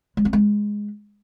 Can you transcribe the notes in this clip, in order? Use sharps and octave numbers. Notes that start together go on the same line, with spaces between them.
G#3
C4
G#3